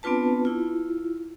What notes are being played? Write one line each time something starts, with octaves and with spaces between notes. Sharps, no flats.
B3 C4 D4 F4 B4 A5
E4 F4